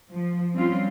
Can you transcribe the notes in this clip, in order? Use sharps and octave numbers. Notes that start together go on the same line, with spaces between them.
F3
G3 C4 C#4 F4